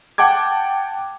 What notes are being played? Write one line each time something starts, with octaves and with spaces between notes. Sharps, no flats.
F#5 G5 A5 D6 G#6